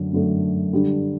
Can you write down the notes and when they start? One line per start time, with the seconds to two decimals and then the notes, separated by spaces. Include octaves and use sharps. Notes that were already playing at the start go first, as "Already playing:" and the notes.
Already playing: F#2 D3 F#3 A3
0.13 F#2 D3 F#3 A3
0.73 D3 G3 D4